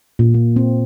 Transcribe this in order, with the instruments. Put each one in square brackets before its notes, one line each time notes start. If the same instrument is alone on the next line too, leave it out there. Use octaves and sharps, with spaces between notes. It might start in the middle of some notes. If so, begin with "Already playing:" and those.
[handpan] A#2
A#3
C4